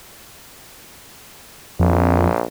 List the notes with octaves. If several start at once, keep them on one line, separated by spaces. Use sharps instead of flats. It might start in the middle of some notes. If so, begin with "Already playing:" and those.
A#1 F2